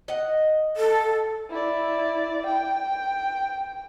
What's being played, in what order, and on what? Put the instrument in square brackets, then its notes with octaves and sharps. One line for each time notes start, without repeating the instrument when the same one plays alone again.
[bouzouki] D#5 F#5
[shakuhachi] A4
[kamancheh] E4 D5
G5